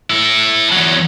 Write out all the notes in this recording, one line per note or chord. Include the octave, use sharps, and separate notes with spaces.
E4 A4
E2 F#3